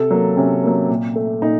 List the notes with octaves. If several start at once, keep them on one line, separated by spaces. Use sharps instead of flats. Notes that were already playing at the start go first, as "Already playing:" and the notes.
Already playing: C3 A4
F#3 A#3
C3 C#4
F#3 A#3
A#2
A3
A#2 D#4